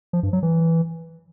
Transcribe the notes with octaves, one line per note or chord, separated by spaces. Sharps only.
F3
G2
F#3
E3